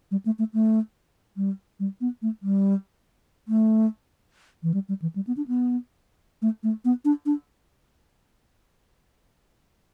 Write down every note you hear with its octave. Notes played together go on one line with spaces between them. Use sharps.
G3
A3
A3
A3
G3
G3
B3
A3
G3
A3
E3
G3
G3
E3
G3
B3
D4
B3
A3
A3
B3
D4
D4